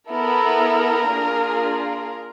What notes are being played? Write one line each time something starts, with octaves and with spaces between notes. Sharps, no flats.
B3 E4 A4 A#4
A#3 D4 F4 G#4